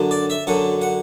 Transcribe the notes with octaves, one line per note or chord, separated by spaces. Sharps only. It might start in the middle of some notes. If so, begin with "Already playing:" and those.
Already playing: F#2 D3
D5
E5
F#2 D3 F#5
F#5